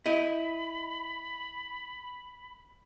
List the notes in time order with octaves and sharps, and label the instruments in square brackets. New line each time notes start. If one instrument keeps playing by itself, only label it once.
[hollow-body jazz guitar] E4 D#5 [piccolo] B5